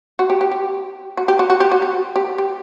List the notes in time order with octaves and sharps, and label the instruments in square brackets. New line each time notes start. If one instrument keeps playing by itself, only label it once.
[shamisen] F#4
G4
G4
G4
F#4
G4
F#4
F#4
G4
F#4
F#4
G4
G4